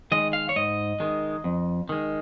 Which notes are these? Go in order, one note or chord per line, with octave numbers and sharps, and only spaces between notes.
D#3 G#3 D#5
F5
C#5
G#2 D#5
D#3 G#3
F2
D#3 G#3